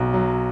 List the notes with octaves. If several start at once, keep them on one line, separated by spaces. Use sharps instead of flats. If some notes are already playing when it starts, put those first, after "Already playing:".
Already playing: B1 F#4
F#3